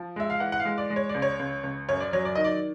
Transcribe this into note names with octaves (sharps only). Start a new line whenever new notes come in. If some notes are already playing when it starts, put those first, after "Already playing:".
Already playing: F3
G#3 E5
F5
E3 F#5
F#5
F5
G#3
D5
G#3
C#5
D5
C#2
C#5
C#2
C#2
F#2 C#5
D5
F#3 C#5
D5
D#3 D#5
D5